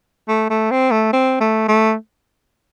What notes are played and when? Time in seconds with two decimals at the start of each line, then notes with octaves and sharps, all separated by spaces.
0.28 A3
0.50 A3
0.71 C4
0.91 A3
1.13 C4
1.41 A3
1.68 A3